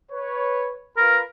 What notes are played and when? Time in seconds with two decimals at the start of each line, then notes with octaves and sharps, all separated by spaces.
0.10 B4 C#5
0.97 F4 A#4 B4 B5